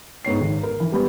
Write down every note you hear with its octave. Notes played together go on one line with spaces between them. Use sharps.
G#2 B3 C#5 C7
G#1
A#4
E3
G3 B3 B4